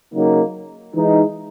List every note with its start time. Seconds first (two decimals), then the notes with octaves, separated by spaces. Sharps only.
0.13 C#3 F#3 A#3 D#4
0.94 E3 G#3 D#4